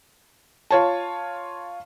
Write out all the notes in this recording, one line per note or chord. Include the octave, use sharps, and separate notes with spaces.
F4 C#5 A5